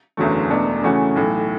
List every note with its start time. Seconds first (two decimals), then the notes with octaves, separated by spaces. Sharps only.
0.17 F#1 E2 D3 F#3 A3
0.50 E1 E2 B2 A3 D4
0.83 C#3 E3 A3 C#4 F#4
1.16 B1 A2 E3